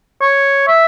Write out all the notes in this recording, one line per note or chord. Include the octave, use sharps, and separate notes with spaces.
C#5
E5